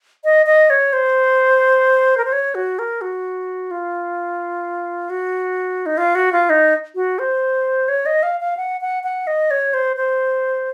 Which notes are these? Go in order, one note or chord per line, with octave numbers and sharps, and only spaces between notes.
D#5
D#5
C#5
C5
A#4
C5
C#5
F#4
A#4
F#4
F4
F#4
D#4
F4
F#4
F4
D#4
F#4
C5
C#5
D#5
F5
F5
F#5
F#5
F#5
D#5
C#5
C5
C5